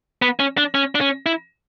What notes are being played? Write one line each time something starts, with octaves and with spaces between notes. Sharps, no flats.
B3
C#4
D4
C#4
D4
C#4
E4